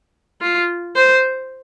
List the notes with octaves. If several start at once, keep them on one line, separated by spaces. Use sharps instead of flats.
F4
C5